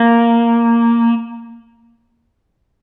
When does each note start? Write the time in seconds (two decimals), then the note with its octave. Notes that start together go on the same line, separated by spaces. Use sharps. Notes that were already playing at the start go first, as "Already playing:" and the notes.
Already playing: A#3